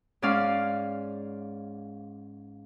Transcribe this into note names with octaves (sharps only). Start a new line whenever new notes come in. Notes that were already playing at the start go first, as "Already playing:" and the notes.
G#2 C#4 D5 F5